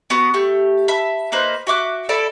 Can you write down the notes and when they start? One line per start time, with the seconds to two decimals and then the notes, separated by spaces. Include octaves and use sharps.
0.10 B3 F#4 D#6
0.34 A3 G4
0.88 E5 A5 B5
1.32 A#3 D#4 B4 C5
1.67 F#4 E5 D6 F#6
2.09 E4 A4 D5 B5